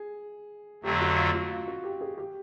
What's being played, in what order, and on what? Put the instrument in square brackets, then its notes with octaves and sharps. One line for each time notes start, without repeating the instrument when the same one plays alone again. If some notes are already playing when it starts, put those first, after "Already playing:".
Already playing: [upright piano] G#4
[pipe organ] F2 D3 F#3 A3 [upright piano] G4
[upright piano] F#4
F4
F#4
F4
F#4
G4
G#4
G4